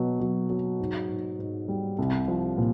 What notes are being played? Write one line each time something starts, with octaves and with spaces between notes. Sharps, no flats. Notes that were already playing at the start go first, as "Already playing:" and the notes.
Already playing: B2 F#3
F#3
F#3
G#2
G#2
G#2
G3
C2
F3
A#2